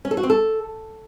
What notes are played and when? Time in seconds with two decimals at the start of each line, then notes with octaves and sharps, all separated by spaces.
0.05 C#4
0.11 A4
0.17 F#4
0.23 C4
0.30 A4